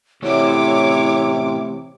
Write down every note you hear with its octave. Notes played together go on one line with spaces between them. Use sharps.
C3 E3 A3 E4 F#4 C#5 D6